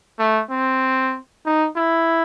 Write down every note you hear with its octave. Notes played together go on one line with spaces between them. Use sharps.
A3
C4
D#4
E4